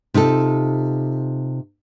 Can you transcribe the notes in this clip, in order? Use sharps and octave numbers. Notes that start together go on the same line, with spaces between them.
C3 D#4 F4 A4